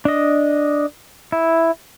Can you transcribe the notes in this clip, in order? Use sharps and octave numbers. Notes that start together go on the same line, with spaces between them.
D4 D#5
E4